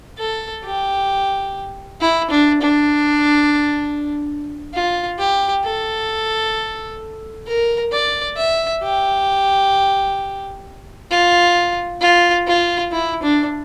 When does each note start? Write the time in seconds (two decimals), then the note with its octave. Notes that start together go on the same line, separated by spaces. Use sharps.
0.18 A4
0.64 G4
2.01 E4
2.31 D4
2.62 D4
4.74 F4
5.19 G4
5.65 A4
7.47 A#4
7.92 D5
8.37 E5
8.83 G4
11.11 F4
12.01 F4
12.47 F4
12.92 E4
13.23 D4